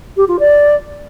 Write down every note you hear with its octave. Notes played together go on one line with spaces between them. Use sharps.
G4
F4
D5